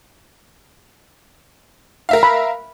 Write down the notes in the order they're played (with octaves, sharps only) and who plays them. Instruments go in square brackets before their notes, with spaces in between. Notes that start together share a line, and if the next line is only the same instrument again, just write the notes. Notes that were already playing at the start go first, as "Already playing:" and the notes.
[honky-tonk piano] A#4 E5 F5
[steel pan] B5